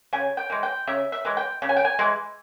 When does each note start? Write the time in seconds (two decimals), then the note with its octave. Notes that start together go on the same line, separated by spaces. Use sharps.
0.13 C#3 G#5
0.37 G5
0.50 E3 G#3
0.63 G5
0.87 C#3 E5
1.12 E5
1.25 E3 G#3
1.37 G5
1.62 C#3
1.69 G#5
1.77 G5
1.85 G#5
1.99 E3 G#3